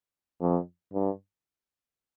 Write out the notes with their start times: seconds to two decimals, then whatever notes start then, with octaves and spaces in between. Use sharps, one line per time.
0.41 F2
0.93 G2